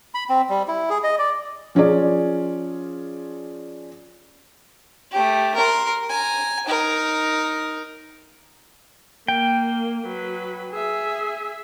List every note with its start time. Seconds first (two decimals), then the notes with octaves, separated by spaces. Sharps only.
0.15 B5
0.29 C4
0.49 G3
0.68 E4
0.90 G#4
1.04 D#5
1.18 D5
1.75 F3 C#4 F4 G#4 D5
5.12 A3 G4
5.56 A#4 C6
6.09 G#5 A#5
6.66 D#4 A#4
9.28 A#3 G5
10.06 F#3 B4
10.71 G#4 E5